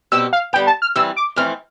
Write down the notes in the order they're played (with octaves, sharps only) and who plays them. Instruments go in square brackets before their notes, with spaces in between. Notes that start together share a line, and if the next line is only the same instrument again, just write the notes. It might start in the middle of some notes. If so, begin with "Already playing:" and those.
[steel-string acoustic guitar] B2 G3 C4 G4 [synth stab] E6
[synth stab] F5
[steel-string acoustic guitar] D3 G3 B3 [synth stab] G5
[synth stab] A5
F6
[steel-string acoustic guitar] G2 E3 G3 C4 [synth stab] E6
[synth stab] D6
[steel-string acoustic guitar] F2 E3 A3 C4 [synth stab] F6